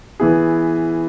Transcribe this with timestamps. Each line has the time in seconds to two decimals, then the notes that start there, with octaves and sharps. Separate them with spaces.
0.20 E3 B3 E4 G#4